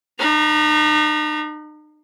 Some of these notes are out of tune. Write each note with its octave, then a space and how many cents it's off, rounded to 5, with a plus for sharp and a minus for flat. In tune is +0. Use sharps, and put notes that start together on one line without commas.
D#4 -40 A#5 +35